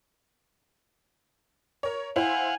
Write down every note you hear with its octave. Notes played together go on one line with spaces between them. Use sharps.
A#4 C#5
E4 C5 F5 F#5 G#5